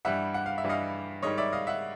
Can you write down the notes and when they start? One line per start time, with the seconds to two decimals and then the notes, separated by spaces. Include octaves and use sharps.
0.05 G2 E3 G3 E5 F#5
0.34 F#5
0.46 F5
0.58 E5
0.64 G2 E3 G3
0.69 D#5 F5
1.23 G#2 D#3 G3 C#5 D#5
1.38 D5 E5
1.53 D#5 F5
1.67 E5 F#5